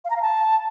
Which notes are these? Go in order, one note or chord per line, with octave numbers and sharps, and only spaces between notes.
F5
A#5
F5
A5